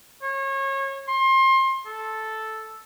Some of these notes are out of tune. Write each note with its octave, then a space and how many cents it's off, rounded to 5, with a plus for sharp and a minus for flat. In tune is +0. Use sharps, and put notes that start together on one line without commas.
C#5 -30
C6 +30
A4 -5